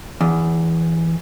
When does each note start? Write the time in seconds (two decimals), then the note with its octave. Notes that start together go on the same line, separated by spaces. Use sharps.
0.21 E2